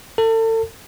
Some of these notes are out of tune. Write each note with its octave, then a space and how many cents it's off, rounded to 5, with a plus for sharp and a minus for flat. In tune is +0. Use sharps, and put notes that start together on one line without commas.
A4 +35